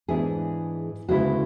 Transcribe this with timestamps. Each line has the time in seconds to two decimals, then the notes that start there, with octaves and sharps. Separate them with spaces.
0.08 G#2 E3 B3 D4 G#4
1.09 D2 C#3 G#3 B3 E4 F#4